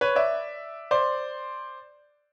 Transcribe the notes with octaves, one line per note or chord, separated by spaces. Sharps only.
B4 C#5
D5 E5
C5 D5